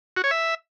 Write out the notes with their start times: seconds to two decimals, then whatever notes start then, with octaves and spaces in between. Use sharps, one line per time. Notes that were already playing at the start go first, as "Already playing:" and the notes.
0.17 F#4
0.24 C#5
0.31 E5